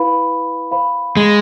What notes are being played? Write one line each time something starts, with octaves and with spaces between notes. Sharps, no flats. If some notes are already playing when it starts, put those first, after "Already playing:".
Already playing: E4 B4 F5 B5
C5 F5 B5
G#3